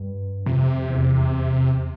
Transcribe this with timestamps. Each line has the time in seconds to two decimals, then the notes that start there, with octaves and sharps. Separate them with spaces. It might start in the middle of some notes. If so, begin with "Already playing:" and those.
Already playing: G2
0.46 F2 C3
0.90 E2